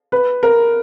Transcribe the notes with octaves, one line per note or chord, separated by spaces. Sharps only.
B4
A#4